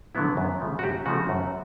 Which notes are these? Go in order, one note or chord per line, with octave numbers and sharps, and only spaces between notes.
D3 F#3 B3 E4
F#2
C#3 F3 A3
F#4
F#2 G4
C#3 F3 A3 F#4
F#2